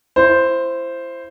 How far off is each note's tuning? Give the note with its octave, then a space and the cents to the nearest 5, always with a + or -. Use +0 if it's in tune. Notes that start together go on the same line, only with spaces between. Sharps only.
E4 +30 C5 +0